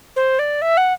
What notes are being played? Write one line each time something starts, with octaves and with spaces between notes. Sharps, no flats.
C5
D5
E5
F#5